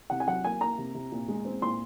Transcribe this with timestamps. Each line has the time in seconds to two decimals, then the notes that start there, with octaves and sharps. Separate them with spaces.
0.10 C3 F#5
0.20 G#5
0.27 F#3 F#5
0.44 A#3 G#5
0.61 A#3 A#5
0.78 C3
0.95 C3
1.12 A#2
1.28 G#3
1.45 C4
1.62 A#2 C6